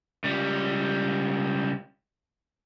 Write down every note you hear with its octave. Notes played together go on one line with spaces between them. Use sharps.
C#2 G3